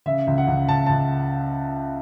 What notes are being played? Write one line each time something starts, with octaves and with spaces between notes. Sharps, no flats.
C#3 E5
C#2
F#5
C#2
C#2 A5
C#2 A5